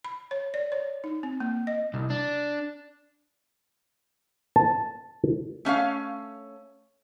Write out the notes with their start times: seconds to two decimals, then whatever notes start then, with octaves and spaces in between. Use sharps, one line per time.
0.05 B5
0.31 C#5
0.54 D5
0.72 C#5
1.04 D#4
1.23 C4
1.40 A#3
1.67 D#5
1.94 C2
2.10 D4
4.56 A5
5.65 A3 C#4 C#5 F5